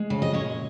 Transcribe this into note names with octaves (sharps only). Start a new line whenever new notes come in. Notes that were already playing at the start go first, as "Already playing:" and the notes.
Already playing: G#3
C#3
D#5
A#2 C#5